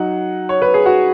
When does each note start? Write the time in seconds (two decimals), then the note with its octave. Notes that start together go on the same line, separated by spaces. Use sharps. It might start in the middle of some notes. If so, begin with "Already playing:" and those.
Already playing: F#3 D#4 F#5
0.49 C#5
0.62 B4
0.74 G#4
0.86 F#4